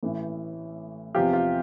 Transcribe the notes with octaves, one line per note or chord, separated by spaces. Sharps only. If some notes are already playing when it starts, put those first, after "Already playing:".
A1 A2 E3
E2 C3 F3 F4 G4
F4